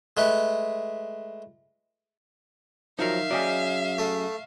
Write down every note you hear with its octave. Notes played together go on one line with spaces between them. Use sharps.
G#3 A3 B4
F3 F#3 D#4 A#4 E5 F5 A#5
F#3 C#4 G#4 D5 D#5 G5
A3